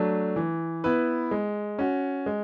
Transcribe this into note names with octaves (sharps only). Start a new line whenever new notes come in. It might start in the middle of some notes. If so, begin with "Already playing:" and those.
Already playing: F#3 A3 D4
E3
B3 E4 B4
G#3
C#4 F#4
G#3